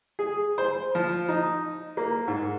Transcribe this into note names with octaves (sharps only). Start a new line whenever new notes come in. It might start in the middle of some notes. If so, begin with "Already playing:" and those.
G#4
C5
F3
D#4
A#3
G#2